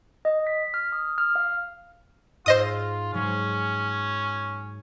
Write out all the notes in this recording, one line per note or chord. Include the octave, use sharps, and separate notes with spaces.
D#5
B6
F6
D#6
F6
F5
G#2 F4 C5 D#5 D#6 E6
G#2 F#3 G#3 C#4